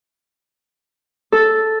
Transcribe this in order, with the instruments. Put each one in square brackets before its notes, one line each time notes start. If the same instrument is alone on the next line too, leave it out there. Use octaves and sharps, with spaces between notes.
[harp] A4